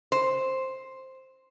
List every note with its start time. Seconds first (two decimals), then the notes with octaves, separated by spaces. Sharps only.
0.12 C5